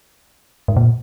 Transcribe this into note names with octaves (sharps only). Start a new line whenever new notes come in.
G#2
A#2